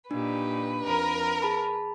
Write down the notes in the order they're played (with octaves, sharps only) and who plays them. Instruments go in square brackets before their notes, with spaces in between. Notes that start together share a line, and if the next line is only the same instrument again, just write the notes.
[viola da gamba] A#2 D#4 G4 [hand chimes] D4 [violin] B4
[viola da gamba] F2 [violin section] A#4
[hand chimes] G#4 A5 B5